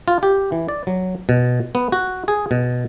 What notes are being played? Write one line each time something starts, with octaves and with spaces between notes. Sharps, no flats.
F4
G4
E3
D5
F#3
B2
B3
F#4
G#4
B2